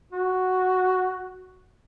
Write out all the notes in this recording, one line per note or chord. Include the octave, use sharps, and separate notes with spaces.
F#4